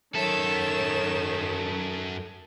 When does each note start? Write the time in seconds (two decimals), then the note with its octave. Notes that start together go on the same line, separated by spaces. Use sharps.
0.15 F#2 D#3 A4 C#5 E5 E7